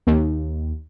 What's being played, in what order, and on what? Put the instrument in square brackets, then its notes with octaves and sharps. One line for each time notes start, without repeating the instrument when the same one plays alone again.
[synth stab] D#2